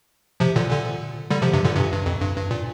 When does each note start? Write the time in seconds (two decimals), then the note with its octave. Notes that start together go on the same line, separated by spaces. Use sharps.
0.40 C3 F3
0.56 A#2 D3
0.70 A#2 D3
1.30 D3 G3
1.42 C3 F3
1.53 G2 C3
1.65 A#2 D3
1.76 G2 C3
1.92 G2
2.06 F2
2.21 G2
2.37 G2
2.51 A#2